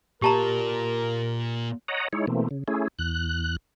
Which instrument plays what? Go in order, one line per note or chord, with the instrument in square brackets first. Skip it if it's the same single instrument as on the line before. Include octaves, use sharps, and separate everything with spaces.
[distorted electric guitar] A#2 [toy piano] G4 A5 A#5 [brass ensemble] A#4
[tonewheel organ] C#5 D#5 F#5 A#5
G#3 D#4 E4 C#5
B2 E3 A3 A#3 C4
C#3
A3 C#4 E4 G#4
E2 F#6